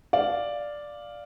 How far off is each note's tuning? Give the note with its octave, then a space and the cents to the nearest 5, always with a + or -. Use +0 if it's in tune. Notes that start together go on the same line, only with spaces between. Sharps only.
D5 +0 F5 +0